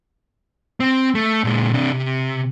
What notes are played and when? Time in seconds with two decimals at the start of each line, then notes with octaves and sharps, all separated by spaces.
0.80 C4
1.15 A3
1.44 A#2 G#3
1.72 C3 D4
1.92 C3